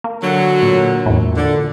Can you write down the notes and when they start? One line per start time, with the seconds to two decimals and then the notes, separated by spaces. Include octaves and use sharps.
0.04 A#3
0.23 D3 F#3
0.62 A#2
1.06 E2 A2
1.37 D3